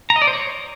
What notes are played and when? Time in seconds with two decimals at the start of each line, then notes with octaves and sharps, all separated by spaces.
0.10 A#5
0.16 D#5
0.22 D5
0.27 C5
0.33 C#5